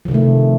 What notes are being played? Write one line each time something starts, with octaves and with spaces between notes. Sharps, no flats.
C3 D#3 F3 A3